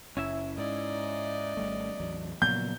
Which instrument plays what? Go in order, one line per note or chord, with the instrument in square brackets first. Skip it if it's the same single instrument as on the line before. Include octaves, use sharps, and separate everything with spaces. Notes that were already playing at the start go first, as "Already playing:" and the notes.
[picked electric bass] F#1 [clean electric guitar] C#4 E4 E5
[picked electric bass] G#2 [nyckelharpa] D5 D#5
[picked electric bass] G#1 G3 A3
A1 E2 F#3
[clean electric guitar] A#2 F#3 [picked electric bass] C#3 F3 B3 [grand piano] G6